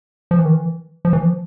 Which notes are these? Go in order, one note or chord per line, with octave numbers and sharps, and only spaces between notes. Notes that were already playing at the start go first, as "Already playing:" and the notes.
F3
E3
D#3
E3
F3
E3
F3